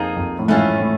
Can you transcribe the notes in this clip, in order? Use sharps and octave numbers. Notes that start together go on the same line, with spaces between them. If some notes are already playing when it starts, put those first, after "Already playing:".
Already playing: F2 F3 A#3 D#4 G#4
F2
A2
G#2 E3 A3 C#4 F4
A2